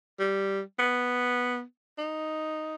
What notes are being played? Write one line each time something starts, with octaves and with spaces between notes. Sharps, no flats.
G3
B3
D#4